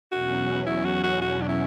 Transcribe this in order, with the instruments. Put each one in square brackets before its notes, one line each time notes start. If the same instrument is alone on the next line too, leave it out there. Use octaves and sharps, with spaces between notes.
[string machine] E2 B2 F#3 C#4 [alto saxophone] F#4
[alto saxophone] E4
F#4
F#4
F#4
D4
E4